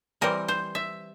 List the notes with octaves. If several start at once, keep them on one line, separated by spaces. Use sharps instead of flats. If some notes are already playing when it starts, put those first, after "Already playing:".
E3 G3 C4 A#4
C5
E5